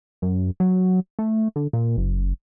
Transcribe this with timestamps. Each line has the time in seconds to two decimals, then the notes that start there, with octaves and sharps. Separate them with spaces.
0.22 F#2
0.60 F#3
1.19 A3
1.56 D3
1.73 A#2
1.98 F#1